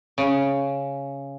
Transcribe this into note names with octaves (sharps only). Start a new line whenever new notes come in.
C#3